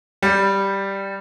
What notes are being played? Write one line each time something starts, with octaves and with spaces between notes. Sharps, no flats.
G3